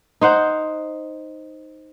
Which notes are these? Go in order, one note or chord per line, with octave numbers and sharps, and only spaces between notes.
D#4 C5 F#5